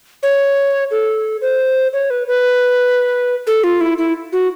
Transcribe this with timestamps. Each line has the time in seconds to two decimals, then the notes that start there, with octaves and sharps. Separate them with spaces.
0.23 C#5
0.91 A4
1.42 C5
1.93 C#5
2.10 B4
2.28 B4
3.47 A4
3.64 F4
3.81 E4
3.98 E4
4.32 F#4